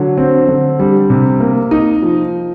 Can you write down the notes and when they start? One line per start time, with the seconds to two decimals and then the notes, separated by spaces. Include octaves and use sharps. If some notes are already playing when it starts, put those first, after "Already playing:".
Already playing: D3 F#3
0.18 C4
0.48 D3
0.79 G3
1.10 C3
1.40 A#3
1.71 D#4
2.02 F3